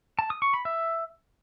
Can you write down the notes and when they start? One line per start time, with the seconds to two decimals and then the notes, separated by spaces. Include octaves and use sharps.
0.19 A5
0.30 D#6
0.42 C#6
0.54 B5
0.65 E5